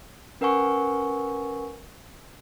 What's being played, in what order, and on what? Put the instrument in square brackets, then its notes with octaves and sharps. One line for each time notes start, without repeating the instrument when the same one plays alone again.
[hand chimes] C#4 A#4 B4 F#5 G#5 C#6